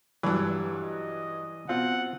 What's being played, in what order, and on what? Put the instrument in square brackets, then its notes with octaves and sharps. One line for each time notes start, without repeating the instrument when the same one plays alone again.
[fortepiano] G2 F#3 [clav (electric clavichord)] E3
[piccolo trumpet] D#5
[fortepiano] B2 F4 [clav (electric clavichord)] C4 [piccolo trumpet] F#5